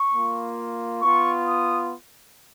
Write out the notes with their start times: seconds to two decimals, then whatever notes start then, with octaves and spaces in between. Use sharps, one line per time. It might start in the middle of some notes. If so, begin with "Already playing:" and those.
Already playing: C#6
0.12 A#3 F4
1.03 B3 F4 C#6
1.47 D#6